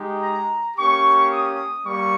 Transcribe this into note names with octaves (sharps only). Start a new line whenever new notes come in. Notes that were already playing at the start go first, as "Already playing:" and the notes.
Already playing: G#3 D#4 G4
A#5
A#3 C#4 G4 C#6
D#6
G3 A#3 C#6